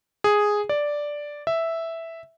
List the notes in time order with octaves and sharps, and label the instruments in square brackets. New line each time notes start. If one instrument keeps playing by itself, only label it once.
[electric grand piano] G#4
D5
E5